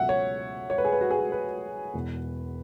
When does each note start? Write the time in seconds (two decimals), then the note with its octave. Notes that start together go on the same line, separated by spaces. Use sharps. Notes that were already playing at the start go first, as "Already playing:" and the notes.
Already playing: C#2 B2 F#3 E5 F#5
0.09 C#5
0.70 C#5
0.78 B4
0.85 G#4
0.92 B4
1.01 F#4
1.11 G#4
1.19 F#4
1.32 B4
1.94 E1 E2 B2